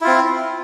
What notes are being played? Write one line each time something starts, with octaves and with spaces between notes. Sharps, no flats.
C4 E4 F4